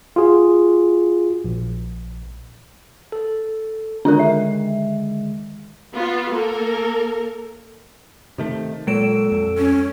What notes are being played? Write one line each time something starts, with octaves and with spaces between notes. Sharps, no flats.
F4 F#4 G#4
A#1
A4
D3 D#3 G#3 D4 A#4
E5
B3 F4
A#3 A4 A#4
C3 D#3 A3
A#2 F#3 G#3 A#3 A4 D7 E7
F2
C#4